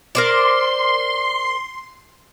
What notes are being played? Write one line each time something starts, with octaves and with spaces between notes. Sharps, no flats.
A#4 C5 D5 C6